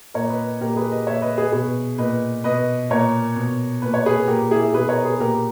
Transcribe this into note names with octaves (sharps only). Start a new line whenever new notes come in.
A#2 A#4 C#5
B4 D#5
A#2 G4 A#4
G#4 B4
B4 D#5
A#2 C#5 E5
B4 D#5
G#4 B4
B2 G#4 B4
A#2 B4 D#5
B2 B4 D#5
A#2 A#4 C#5
B2
A#2 B4
C#5
G#4 B4
A#2 G4 A#4
E4 G#4
B2 G#4 B4
A#4 C#5
G#4 B4
A#2 G4 A#4